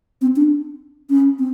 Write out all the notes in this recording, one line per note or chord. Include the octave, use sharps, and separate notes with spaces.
C4
D4
C#4
C4